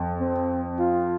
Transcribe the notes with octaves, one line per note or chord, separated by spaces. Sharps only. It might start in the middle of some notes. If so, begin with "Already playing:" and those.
Already playing: F2
C4
F4